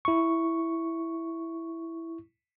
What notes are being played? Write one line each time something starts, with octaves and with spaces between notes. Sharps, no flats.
E4 C#6